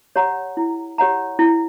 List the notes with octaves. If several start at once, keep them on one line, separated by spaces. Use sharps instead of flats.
G4 C#5 F#5 A#5
E4
G4 C#5 F#5 A#5
E4